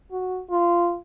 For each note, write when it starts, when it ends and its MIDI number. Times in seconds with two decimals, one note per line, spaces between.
0.12 0.41 66
0.50 0.97 65